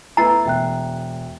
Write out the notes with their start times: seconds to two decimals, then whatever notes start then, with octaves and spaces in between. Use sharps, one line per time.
0.17 A3 B3 E4 A#5 E6 A6 C7
0.45 E1 E5 G5 F#6